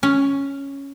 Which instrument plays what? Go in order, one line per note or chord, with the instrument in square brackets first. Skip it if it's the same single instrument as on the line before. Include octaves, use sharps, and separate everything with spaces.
[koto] C#4